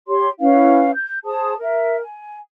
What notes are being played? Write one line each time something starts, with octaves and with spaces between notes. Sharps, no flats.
G4 C#5 C6
C#4 E4 B4 F5
G6
G#4 C5 A5 D#6
A#4 E5
G#5